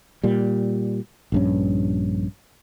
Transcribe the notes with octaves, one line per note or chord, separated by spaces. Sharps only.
A#2 G3
A#1 G2 C#4